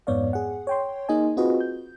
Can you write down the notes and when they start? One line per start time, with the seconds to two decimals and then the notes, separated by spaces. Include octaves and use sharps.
0.07 F2 G#2 B3 C#5 D5 F5
0.33 G#4 F#5
0.67 C#5 G5 C6
1.09 A#3 D#4 G#4 D#5 G#5
1.37 C4 F4 F#4 G#4 B4 D#5
1.60 G6